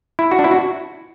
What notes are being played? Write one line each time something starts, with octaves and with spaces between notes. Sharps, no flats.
E4
F#4
D4
E4
F#4